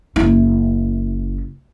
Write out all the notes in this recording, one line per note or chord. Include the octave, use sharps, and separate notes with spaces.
F#1 E4